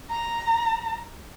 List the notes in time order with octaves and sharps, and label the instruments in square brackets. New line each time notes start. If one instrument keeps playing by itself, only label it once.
[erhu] A#5